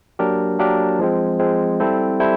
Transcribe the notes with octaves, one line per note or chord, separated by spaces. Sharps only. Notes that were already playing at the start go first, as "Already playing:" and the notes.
F#3 A#3 D4 G4 A#4
F#3 A#3 D4 G4 A#4
F3 G#3 C4
F3 G#3 C4
G3 C4 E4 A4 C5
G3 C4 E4 A4 C5